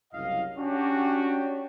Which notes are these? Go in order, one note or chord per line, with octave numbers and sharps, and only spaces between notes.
F#1 C2 F#3 D#5 F5
C#4 D4 F#4 G4